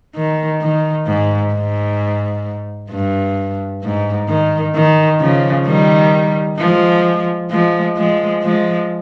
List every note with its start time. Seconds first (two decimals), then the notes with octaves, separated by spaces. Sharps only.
0.15 D#3
0.61 D#3
1.07 G#2
1.53 G#2
2.91 G2
3.83 G#2
4.28 D#3
4.75 D#3
5.20 C#3 F3
5.66 D#3 G3
6.58 F3 G#3
7.51 F3 G#3
7.96 F3 G#3
8.43 F3 G#3